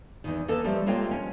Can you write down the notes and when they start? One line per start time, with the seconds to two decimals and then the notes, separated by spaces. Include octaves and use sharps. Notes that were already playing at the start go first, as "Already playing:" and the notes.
0.24 E2 G#2 D#3
0.48 A#3 A4 B4 D#5 A5
0.64 F3 G3 A3
0.87 G#3 A#3 F4 C#5 D#5 G5
1.11 C#4